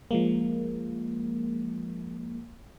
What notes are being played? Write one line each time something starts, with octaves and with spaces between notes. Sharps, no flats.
F3 G#3 A#3